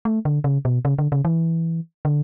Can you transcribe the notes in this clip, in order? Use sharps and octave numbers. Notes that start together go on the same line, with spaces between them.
A3
D3
C#3
B2
C#3
D3
C#3
E3
D3